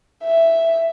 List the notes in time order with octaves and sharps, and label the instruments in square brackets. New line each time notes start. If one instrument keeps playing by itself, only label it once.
[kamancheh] E5